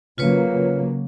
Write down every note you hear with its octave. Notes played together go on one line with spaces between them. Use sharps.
C#3 F#3 A#3 F4 B4 C#5